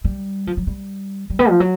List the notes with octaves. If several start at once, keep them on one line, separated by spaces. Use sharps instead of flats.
G3
F3
F#3
G3
G3
B3
F3
F#3